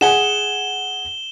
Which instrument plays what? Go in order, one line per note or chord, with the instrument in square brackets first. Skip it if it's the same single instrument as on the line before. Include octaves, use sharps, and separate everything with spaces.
[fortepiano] G#4 F#5 G#5 [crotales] E7 G7